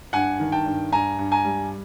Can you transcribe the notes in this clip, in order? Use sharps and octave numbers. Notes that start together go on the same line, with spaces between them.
G2 F#5 G#5
D#3
G5 A5
G2
G2 G#5 A#5
G2
G#5 A#5
G3